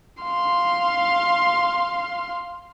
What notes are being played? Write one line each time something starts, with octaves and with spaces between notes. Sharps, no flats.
F5 C6